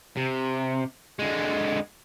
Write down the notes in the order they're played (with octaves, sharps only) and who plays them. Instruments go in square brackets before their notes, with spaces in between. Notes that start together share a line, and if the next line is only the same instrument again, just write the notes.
[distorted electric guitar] C3
D3 G#3